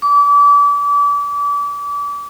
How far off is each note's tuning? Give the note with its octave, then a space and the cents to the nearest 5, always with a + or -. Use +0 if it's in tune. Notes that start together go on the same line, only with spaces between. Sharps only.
D6 -35